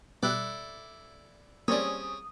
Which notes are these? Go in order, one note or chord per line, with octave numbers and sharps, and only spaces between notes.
B2 G3 E4 A4 D5 F#6
G3 A#3 C4 C#4 G#4 C#5 D5 D#6